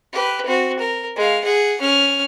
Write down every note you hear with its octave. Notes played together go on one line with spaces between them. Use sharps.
G4 B4
C4 F#4
A#4
G#3 F5
G#4 F#5
C#4 F6